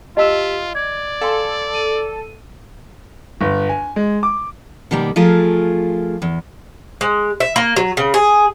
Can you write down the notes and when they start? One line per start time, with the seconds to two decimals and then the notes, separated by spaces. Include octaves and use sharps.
0.17 F4 G4 D#5 A5 E6 B6 E7
0.75 D5 G#6
1.21 A4 F5 G#5 C6
1.74 D#7
3.41 G1
3.69 G#5
3.96 G#3
4.23 D6
4.91 B2 D#3 G3 A#3
5.16 F3 A3 F4 G#4 A#4
6.22 E2
7.01 G#3
7.40 E5
7.56 A#3
7.76 F#3
7.97 C#3
8.14 G#4